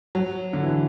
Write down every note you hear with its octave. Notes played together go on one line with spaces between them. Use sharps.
F#3
D3
E3